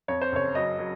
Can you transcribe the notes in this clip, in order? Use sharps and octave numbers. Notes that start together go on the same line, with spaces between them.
F2 C#5
C5
F#1 C#5
F#3 D#5
F#3